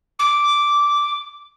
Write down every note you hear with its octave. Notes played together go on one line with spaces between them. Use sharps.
D6